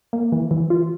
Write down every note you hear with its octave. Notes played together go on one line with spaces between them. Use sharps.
A#3
E3
E3
F4